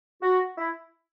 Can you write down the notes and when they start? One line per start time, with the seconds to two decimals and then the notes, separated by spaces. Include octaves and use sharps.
0.22 F#4
0.58 E4